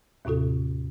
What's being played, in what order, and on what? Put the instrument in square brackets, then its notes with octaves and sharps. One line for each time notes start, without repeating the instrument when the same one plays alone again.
[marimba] D#2 A2 C3 F4 A4